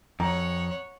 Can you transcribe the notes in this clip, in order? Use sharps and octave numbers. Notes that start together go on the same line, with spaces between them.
F2 C#5 F#5 A#5